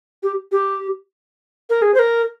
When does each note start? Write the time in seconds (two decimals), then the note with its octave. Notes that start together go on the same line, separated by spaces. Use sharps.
0.23 G4
0.52 G4
1.70 A#4
1.82 G#4
1.94 C5
1.99 A#4